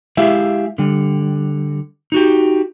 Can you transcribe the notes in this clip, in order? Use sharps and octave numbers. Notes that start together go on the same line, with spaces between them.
G#3 E4 G4 G#4 E5 F5
D3 G3
D#4 F#4 G4